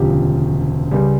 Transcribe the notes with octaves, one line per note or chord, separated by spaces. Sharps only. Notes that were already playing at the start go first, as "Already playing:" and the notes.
Already playing: E1 D2 C#3 F3 G4
C#2 C#3 G3